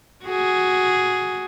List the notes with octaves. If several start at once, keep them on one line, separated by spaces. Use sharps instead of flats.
F#4 G#4